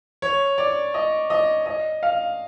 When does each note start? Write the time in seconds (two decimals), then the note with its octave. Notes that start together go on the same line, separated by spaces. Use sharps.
0.22 C#5
0.58 D5
0.94 D#5
1.30 D#5
1.66 D#5
2.03 F5